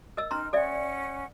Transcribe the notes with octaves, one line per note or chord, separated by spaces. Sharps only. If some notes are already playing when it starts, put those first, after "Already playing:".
A#4 D#5 E6
C#4 D#4 A#5 C6 F6
C#4 A4 D5 E5 F#5